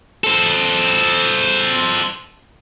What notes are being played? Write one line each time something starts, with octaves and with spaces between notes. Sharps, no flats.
A4 C5